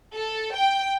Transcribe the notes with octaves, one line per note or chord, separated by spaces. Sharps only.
A4
G5